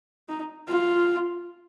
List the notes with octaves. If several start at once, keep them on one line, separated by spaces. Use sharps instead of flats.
D#4
F4